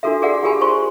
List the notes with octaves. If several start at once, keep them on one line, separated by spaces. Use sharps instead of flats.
D4 F4 F#4 A4 A#4 E5
F#4 G#4 A#4 D5 E5 F#5
F4 G4 G#4 A#4 G#5 B5
F4 C5 C6 C#6